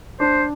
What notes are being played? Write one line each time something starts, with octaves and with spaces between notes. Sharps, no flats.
D4 C5